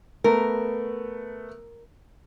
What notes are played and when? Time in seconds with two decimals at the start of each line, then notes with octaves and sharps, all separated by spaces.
0.24 A3 B3 A#4